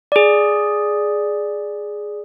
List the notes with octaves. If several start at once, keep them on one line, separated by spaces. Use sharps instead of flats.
G#4 D5